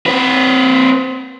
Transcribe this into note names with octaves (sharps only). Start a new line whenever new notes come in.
C4 B4